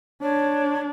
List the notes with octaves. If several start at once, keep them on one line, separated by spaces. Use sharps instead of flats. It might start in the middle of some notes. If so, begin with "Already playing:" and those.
D4 C#5